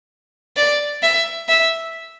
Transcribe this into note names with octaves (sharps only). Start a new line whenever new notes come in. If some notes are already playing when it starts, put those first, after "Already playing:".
D5
E5
E5